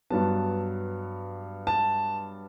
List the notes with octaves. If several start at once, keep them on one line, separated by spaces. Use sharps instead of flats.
G2 F#3 B3 A5
A5